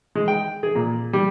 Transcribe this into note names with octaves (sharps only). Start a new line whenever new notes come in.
G#3
G5
G#4
A#2
G3